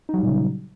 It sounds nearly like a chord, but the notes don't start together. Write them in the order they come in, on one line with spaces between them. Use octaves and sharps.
D#4 F#3 G3 A#2 C#3